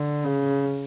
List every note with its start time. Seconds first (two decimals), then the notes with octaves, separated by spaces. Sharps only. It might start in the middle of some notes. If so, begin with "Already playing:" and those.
Already playing: D3
0.24 C#3